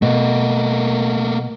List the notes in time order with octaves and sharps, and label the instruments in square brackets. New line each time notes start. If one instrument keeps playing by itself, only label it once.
[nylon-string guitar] B2 [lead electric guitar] A3 A#3